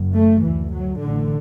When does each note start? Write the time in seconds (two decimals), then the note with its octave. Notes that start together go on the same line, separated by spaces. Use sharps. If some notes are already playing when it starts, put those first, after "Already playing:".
Already playing: F#1 F#2
0.16 A3
0.44 D2 E3
0.72 F#3
1.00 A1 A2 D3